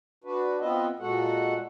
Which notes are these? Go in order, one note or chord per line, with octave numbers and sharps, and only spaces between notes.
D4 F#4 B4
B3 C4 F4 B4 D#5 E5
A#2 G#3 F#4 A4 F#5